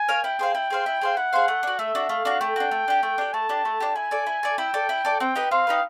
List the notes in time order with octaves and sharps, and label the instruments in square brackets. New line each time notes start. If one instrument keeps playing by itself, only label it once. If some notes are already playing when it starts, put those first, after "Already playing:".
Already playing: [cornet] G#5
[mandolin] A#4 C#5 F5
[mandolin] E4 [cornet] G5
[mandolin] G#4 C5 F5
[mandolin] E4 [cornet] G5
[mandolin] G#4 C5 F5
E4
G#4 C5 F5
[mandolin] E4 [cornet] F#5
[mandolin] G#4 C5 F5
A3
D4 F#4
[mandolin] A3 [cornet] E5
[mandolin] D4 F#4
[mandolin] A3 [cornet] F5
[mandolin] D4 F#4
[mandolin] A3 [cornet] G5
[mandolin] D4 F#4
A3
D4 G4
A3
D4 G4
[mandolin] A3 [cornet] A5
[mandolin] D4 G4
A3
D4 G4
[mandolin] E4 [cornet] G#5
[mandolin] A4 D5
E4
A4 D5
[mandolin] E4 [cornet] G5
[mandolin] A4 D5
E4
A4 D5
[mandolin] C4 [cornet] G5
[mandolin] D#4 G4 B4
[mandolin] C4 [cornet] F5
[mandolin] D#4 G4 B4